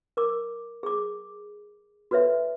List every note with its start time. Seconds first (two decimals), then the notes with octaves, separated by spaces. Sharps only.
0.17 A#4 D6
0.83 G#4 D6
2.11 F#4 A4 B4 C#5 E5